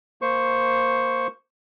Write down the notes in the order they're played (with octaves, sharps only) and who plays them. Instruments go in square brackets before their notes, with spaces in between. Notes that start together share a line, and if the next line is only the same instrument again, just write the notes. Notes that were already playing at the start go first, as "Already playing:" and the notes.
[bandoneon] A#3 C5 C#6